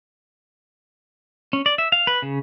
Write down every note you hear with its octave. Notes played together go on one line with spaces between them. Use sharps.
C#4
D5
E5
F5
B4
C#3